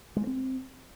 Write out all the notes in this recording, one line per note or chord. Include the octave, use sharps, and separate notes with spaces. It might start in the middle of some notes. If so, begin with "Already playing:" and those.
G#3
A#3
C4